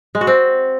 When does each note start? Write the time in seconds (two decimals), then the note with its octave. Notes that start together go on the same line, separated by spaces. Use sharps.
0.15 G#3
0.21 F#4
0.27 C4